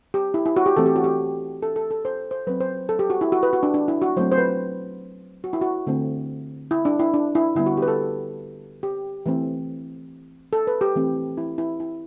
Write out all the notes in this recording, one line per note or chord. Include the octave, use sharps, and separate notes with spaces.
G4
E4
E4
F#4
G4
E3 A3 C4 A4
G4
F#4
G4
A4
A4
A4
C5
C5
F#3 C4 B4
C5
A4
G4
F#4
E4
F#4
B4
F#4
D4
D4
E4
F#4
F#3 A3 C4 C5
C5
B4
F#4
E4
F#4
D3 A3 C4
E4
D4
E4
D4
E4
D3 G3 B3 E4
F#4
G4
B4
A4
G4
E3 A3 C4
A4
B4
G4
E3 A3 C4
E4
E4
E4